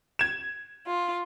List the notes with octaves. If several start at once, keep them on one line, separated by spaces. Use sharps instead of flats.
G#6 E7
F4